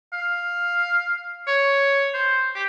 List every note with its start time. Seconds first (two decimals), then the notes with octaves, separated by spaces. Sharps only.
0.13 F5
1.48 C#5
2.14 C5
2.55 G4